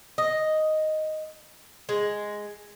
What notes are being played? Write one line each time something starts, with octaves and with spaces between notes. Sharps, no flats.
D#5
G#3